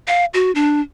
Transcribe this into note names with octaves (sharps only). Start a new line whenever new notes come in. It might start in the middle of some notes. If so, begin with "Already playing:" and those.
F5
F#4
D4